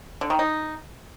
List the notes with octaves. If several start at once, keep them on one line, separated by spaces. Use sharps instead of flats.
D3
D#3
D#4